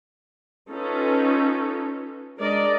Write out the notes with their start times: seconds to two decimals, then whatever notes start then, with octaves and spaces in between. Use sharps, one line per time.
0.69 C#4 D#4 F4 A4 B4
2.38 G#3 D4 A#4 D5 D#5